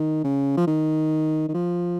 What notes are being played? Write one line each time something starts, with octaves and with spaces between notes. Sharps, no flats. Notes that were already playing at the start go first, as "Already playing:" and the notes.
Already playing: D#3
C#3
F3
D#3
D#3
F3